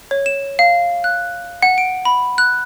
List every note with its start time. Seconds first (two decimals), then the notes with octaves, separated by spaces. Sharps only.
0.11 C#5
0.26 E7
0.59 F5
1.04 F#6
1.62 F#5
1.78 D7
2.05 B5
2.38 F#6